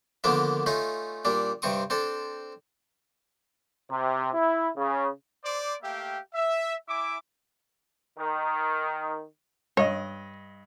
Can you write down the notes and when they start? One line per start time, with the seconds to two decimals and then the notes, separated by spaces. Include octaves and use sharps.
0.24 D3 D#3 F3 A#3 B3 D4
0.66 A3 C#4 D#4 F4
1.25 A#2 G3 D4
1.62 G2 C3 C4 C#6 D#6
1.90 C4 D4 A4
3.90 C3
4.34 E4
4.77 C#3
5.44 C5 D5 D6
5.83 A3 A#3 G4 E5 F5 G5
6.34 E5
6.89 E4 E5 G#5 D6
8.18 D#3
9.77 G2 C#5 D#5